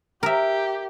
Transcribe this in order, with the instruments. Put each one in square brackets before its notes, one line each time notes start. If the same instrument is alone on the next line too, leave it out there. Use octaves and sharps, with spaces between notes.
[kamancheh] G4 [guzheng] A#4 E5